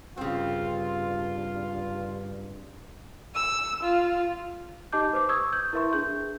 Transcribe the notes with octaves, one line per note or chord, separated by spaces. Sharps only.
G2 C#3 C4 F4
E6
F4
D#4 G4 D#5 A5 D6 G6
B4 C5 D6
C#6 D#6 E6 G#6
G6
E4 A#4 B4 E5 C6 C#6
D4 G#4 G6